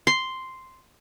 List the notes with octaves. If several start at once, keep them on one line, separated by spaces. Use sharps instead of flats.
C6